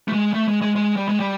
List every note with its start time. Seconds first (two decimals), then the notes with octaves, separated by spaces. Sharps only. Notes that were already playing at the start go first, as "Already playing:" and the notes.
0.08 A3
0.13 G#3
0.34 A3
0.48 G#3
0.62 G#3
0.76 G#3
0.96 G3
1.09 G#3
1.20 G3